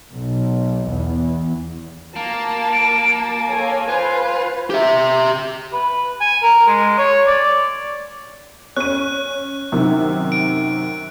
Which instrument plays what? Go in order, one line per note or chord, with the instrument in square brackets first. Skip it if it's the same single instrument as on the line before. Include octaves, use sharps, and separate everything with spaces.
[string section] B1
E2
[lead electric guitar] A#3 [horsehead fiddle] A5
[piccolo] D7
[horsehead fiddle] A4 C#5 [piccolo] G#5
[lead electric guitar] F4 [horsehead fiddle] B4 C5
[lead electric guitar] G4 E5
[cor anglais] B4
G#5
A#4
G#3
C#5
D5
[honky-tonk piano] C#4 D#7 [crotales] F#6
[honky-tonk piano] F#2 C3 D#3
[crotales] D7